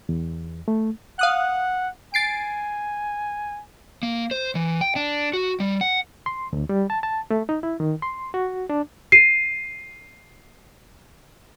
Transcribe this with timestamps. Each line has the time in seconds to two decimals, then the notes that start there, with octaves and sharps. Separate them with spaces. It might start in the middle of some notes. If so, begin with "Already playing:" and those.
0.09 E2
0.68 A3
1.19 F5 F#5 D#6 F#6
2.14 G#5 A6 C7 D7
4.03 A#3
4.31 C5
4.55 E3
4.81 G5
4.96 D4
5.33 F#4
5.60 G3
5.81 F#5
6.26 C6
6.53 D2
6.69 G3
6.90 A5
7.03 A5
7.31 A3
7.49 D#4
7.63 E4
7.80 D#3
8.02 C6
8.34 F#4
8.70 D4
9.12 C7 D#7